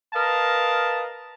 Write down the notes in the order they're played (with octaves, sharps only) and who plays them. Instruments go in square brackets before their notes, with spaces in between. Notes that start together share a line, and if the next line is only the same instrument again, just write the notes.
[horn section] A#4 B4 D#5 F5 A5